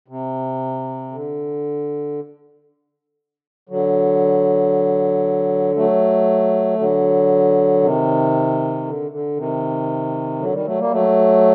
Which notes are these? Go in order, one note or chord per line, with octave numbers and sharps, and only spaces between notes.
C3
D3
D3 F#3
F#3 A3
D3 F#3
C3 D#3
D3
D3
C3 D#3
D3 F#3
D#3 G3
F#3 A3
G3 A#3
F#3 A3